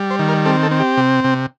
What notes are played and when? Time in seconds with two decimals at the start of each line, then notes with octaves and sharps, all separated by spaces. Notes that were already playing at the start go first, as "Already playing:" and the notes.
Already playing: G3
0.11 C5
0.19 D#3
0.28 A#4
0.45 C4 A4
0.63 A4
0.71 C4
0.80 G4
0.97 C3
1.24 C3